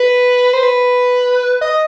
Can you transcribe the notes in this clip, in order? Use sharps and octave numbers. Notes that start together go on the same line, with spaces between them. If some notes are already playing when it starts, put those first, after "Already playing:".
Already playing: B4
C5
B4
D#5